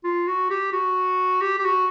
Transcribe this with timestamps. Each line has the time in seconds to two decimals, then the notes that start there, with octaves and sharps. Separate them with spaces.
0.04 F4
0.27 F#4
0.50 G4
0.72 F#4
1.41 G4
1.58 G4
1.65 F#4